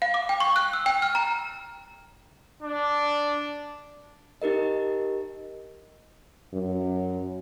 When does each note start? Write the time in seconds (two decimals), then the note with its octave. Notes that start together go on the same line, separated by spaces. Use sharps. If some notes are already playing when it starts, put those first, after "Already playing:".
0.02 F5
0.14 D6
0.29 G5
0.40 C#6
0.56 F#6
0.73 E6
0.86 G5
1.02 F6
1.15 A#5
2.63 D4
4.42 D#4 G4 A#4 D#5
6.53 F#2